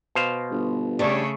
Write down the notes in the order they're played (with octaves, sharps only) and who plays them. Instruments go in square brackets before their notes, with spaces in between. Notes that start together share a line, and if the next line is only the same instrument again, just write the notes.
[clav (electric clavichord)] B2 C5 F5
[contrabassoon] G1
[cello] C#3 A3 [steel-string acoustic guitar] G3 D4 C#5